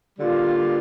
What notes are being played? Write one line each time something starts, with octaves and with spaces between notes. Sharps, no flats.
D3 G3 A#3 F4